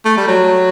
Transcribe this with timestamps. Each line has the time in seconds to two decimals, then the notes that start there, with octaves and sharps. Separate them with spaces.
0.05 A3
0.17 G3
0.28 F#3